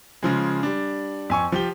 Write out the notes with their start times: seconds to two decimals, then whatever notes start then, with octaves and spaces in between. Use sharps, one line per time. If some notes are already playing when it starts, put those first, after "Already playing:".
0.23 C#3 F3 G#3
0.63 G3 D4
1.30 F2 G#5 C#6
1.52 F3 G4 G7